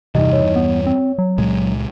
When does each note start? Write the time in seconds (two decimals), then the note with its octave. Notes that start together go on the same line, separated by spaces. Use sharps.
0.15 E2 G2 C3 E3 D#4 D#5
0.33 C#5
0.56 B3
0.86 C4
1.18 F#3
1.38 C#2 A#2 G#3